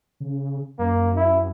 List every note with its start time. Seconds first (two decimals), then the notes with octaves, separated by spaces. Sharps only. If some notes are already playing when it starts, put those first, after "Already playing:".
0.20 C#3
0.79 F#2 A#3
1.16 E4